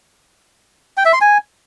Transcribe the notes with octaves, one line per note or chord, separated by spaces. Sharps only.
G5
E5
C6
G#5